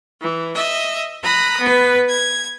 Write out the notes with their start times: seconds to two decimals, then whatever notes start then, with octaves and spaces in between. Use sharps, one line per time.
0.20 E3
0.56 D#5 E5
1.22 A#5 B5 D#6 F#6
1.60 B3 B4
2.09 G#6